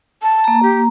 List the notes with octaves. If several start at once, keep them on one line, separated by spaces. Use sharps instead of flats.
A5
A#3 A#5
G4